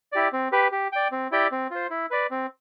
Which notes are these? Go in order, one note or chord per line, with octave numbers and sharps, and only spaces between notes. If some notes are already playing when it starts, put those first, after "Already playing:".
E4 G4 D5
C4
G4 B4
G4
D5 G5
C4
E4 G4 D5 G5
C4
F4 C5
E4
B4 D5
C4